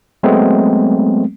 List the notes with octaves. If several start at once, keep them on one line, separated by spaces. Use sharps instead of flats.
F#3 G#3 A3 B3 C4